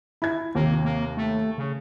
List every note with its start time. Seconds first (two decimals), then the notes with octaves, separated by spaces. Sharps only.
0.22 E4 G#6
0.55 D#2 C3 A#3
0.85 A#3
1.17 A3
1.58 C#3